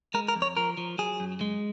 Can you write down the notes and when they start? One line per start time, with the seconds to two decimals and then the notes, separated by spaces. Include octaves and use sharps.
0.14 G#3 A#4
0.28 A#4
0.36 F2
0.42 C#5
0.57 F3 A#4
0.77 F3
0.98 F#3 G#4
1.20 F#2
1.41 G#3